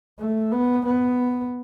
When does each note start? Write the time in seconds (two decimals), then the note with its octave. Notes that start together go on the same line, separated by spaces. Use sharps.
0.19 A3
0.52 B3
0.86 B3